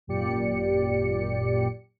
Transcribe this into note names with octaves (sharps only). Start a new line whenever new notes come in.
G#1 F#2 A#2 G4 D5 C#7